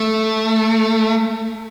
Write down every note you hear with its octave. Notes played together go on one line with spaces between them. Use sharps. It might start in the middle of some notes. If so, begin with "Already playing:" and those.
Already playing: A3